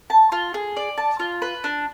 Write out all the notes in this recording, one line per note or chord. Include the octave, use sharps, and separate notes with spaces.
A5
F4
G#4
D5
A5
F4
B4
D4